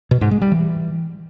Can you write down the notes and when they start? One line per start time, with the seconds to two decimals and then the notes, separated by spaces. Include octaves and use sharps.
0.11 B2
0.21 G#2
0.31 G#3
0.41 G3
0.52 E3